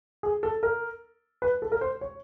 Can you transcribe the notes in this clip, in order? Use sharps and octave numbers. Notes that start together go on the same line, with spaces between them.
G#4
A4
A#4
B4
A4
A#4
C5
C#5